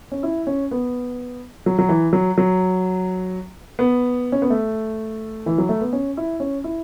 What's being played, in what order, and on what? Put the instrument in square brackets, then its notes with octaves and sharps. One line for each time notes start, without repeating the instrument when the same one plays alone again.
[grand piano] C#4
E4
C#4
B3
F#3
F#3
E3
F#3
F#3
B3
C#4
B3
A3
E3
F#3
A3
B3
C#4
E4
C#4
E4